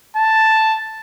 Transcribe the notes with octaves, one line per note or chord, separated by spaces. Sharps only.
A5